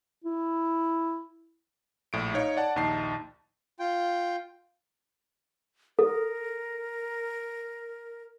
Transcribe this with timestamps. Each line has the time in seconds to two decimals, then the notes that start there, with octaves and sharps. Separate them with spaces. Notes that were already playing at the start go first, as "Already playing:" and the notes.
0.24 E4
2.13 A#1 A2 D7
2.34 D#4 C#5 F5
2.57 D5 F#5 A5
2.76 A#1 D#2 D#4 A5 C7
3.79 F4 G5
5.99 A4 A#4